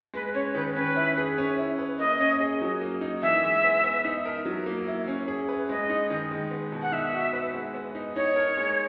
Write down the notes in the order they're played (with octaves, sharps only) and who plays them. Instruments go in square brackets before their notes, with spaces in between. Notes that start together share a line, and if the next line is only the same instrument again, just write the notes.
[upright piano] G#3 [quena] B4
[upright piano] C#4 [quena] C#5
[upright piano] D#3 [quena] B4
[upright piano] C#4 [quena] B4
[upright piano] E4
G#4
C#4
E4
B4
[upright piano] A#3 [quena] D#5
[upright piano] C#4
G#4
F#3
A#3
D#4
[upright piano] E3 [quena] E5
[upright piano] G#3
B3
B3
D#4
A#4
F#3
A#3
E4
C#4
G#4
B4
[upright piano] G#3 [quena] D#5
[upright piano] D#4
D#3
G#3
B3
B2
[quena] F#5
[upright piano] D#4 [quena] E5
[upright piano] F#4
B4
G#3
B3
D#4
[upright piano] D#4 [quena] C#5
[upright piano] A#4
G#3